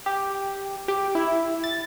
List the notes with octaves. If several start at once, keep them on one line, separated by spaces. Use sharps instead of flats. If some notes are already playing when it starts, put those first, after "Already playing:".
G4
G4
E4
A6